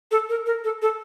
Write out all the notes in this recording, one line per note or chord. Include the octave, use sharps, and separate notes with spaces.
A4
A#4
A#4
A4
A4